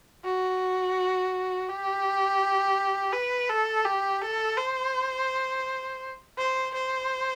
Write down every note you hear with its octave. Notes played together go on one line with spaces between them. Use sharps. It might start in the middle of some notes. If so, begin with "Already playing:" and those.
F#4
G4
B4
A4
G4
A4
C5
C5
C5